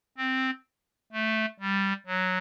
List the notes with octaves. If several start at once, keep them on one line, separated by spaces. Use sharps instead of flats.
C4
A3
G3
F#3